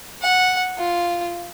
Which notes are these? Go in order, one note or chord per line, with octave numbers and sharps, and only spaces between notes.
F#5
F4